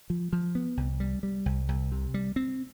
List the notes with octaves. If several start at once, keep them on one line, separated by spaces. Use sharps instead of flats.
F3
F3
B3
C2
G3
G3
C2
C2
C3
G3
C4